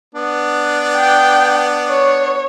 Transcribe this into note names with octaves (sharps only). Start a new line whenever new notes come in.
B3 D4
G5
C#5